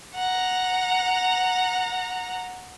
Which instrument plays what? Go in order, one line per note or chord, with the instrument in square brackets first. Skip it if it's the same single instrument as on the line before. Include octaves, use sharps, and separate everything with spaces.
[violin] F#5 A#5